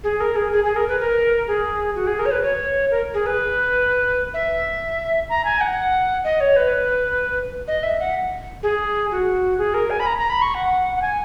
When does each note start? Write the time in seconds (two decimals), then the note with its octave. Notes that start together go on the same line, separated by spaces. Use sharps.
0.04 G#4
0.20 A#4
0.36 G#4
0.52 G#4
0.64 G#4
0.76 A#4
0.88 B4
1.00 A#4
1.47 G#4
1.95 F#4
2.07 G#4
2.19 A#4
2.26 C#5
2.31 B4
2.43 C#5
2.91 A#4
3.14 G#4
3.26 B4
4.34 E5
5.29 A#5
5.45 G#5
5.61 F#5
6.24 D#5
6.40 C#5
6.56 B4
7.68 D#5
7.83 E5
8.00 F#5
8.63 G#4
9.11 F#4
9.58 G#4
9.74 A#4
9.90 G#5
10.00 B5
10.06 A#5
10.17 A#5
10.30 B5
10.42 C#6
10.54 F#5
10.96 F#5
11.02 G#5